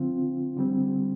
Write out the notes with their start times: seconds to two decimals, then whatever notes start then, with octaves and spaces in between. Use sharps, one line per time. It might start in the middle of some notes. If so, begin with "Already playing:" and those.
Already playing: D3 F3 C4 F4
0.57 D3 G3 C4